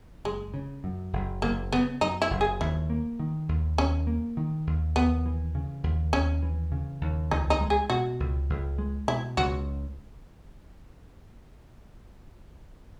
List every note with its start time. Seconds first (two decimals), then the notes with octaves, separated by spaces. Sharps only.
0.24 F#1 G#3
0.54 C#3
0.84 F#2
1.13 F#1
1.42 F#1 A#3
1.72 C#3 B3
2.01 F#2 D#4
2.22 E4
2.31 F#1
2.41 G#4
2.61 D#2 E4
2.90 A#3
3.20 D#3
3.49 D#2
3.78 D#2 C#4
4.07 A#3
4.37 D#3
4.67 D#2
4.96 D#2 B3
5.26 E3
5.55 C#3
5.84 D#2
6.13 D#2 C#4
6.43 E3
6.72 C#3
7.01 D#2
7.31 C#2 D#4
7.50 D#4
7.61 G#3
7.70 G#4
7.90 B2 F#4
8.20 C#2
8.50 C#2
8.78 G#3
9.08 B2 E4
9.37 C#2 F#4